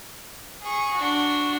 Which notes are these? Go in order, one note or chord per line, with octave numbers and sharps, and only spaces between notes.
G#4 C#6
D4 F#4